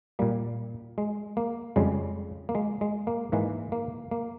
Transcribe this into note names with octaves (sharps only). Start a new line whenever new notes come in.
A#2 G3 A#3
G#3
A#3
F2 C#3 G3 G#3
A#3
G#3
G#3
A#3
G#2 E3 G#3 A#3
A#3
A#3